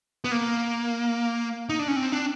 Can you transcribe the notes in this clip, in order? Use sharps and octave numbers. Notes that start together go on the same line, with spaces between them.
B3
A#3
D#4
D4
C#4
C4
D4